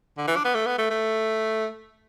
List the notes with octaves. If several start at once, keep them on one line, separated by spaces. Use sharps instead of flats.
D3
E3
D4
B3
A3
B3
A3
A3